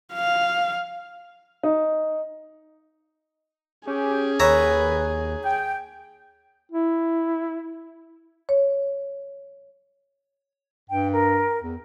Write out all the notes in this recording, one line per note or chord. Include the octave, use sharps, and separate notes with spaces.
F5
D#4
C#4 G4 G#4
D#2 D#3 B4 C#5 E5 A#5
G5
E4
C#5
G2 G5
A#4
E2